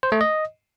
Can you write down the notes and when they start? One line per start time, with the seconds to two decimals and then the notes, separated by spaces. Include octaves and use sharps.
0.03 C5
0.12 A3
0.21 D#5